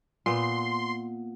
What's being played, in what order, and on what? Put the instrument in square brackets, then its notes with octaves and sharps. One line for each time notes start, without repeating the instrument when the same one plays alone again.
[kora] A#2 B3 [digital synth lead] C6